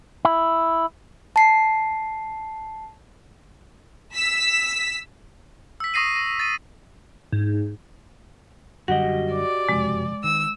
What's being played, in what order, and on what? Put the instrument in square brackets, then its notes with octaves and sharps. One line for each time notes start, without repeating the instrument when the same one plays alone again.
[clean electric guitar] E4
[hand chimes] A5 C7
[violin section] E6 B6
[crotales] E6 B6
C#6 D#6 A#6 C7 D#7
A#6
A6 D#7
[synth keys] G#2
[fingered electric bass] F#2 D3 G3 [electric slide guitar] F#4 G4 D#5 [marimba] F#5
[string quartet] D5
[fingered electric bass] F#1 F2 C3 [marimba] G#3
[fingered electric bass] D#3 [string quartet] E6